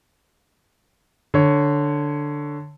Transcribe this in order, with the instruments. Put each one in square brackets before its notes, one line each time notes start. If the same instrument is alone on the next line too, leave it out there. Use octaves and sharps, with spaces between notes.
[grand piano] D3 C#5